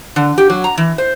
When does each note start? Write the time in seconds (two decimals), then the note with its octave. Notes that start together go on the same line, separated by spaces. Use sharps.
0.16 D3
0.38 G4
0.50 F#3
0.64 A#5
0.78 E3
0.98 C5